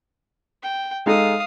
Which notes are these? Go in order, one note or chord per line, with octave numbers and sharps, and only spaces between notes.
G5
G#3 D#4 A4 F5 D#6